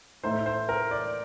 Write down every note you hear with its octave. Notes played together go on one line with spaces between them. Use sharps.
A2 A3 D#4 C5
C5
A#4
D5